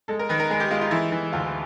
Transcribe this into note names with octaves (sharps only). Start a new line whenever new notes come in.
G#3 A4
A#4
D#3 B4
A#4
G#3 G#4
G4
G#3 F4
F4
E3 E4
E3
D2 F4